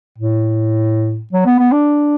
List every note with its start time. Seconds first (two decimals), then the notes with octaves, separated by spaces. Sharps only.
0.19 A2
1.33 F#3
1.46 B3
1.59 B3
1.72 D4